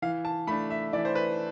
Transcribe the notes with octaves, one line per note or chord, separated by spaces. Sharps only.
E3 F5
A5
A3 D4 B5
E5
E3 D5
C5
B4